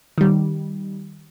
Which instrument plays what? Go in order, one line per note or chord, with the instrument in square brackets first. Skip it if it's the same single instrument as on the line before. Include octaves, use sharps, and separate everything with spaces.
[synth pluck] D#3 G3